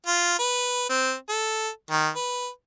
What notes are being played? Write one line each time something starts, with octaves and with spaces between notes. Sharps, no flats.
F4
B4
C4
A4
D#3
B4